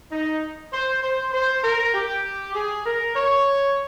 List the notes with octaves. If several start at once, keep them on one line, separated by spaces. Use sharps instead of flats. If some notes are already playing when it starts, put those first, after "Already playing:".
D#4
C5
C5
C5
A#4
G4
G#4
A#4
C#5